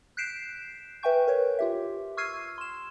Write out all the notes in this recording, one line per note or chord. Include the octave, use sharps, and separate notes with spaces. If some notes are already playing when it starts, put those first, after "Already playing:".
F#6 G6 B6 C7 D7 E7
B4 E5 G5 G#5 C#6 G6
A#4 B4 C#5
F4 G4 E5
C#6 E6 F6 G#6 C7 D#7
C6 E7